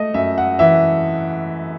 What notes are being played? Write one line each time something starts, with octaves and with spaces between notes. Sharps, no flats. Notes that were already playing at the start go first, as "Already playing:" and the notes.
Already playing: A3 D#5
F#2 E5
F#5
E3 E5